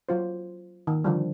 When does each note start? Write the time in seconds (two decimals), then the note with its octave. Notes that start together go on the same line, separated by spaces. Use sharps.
0.09 F#3 F4 C5
0.87 D#3
1.04 D3 F3 G3